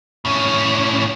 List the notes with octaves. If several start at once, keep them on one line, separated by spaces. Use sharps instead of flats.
A2 C#4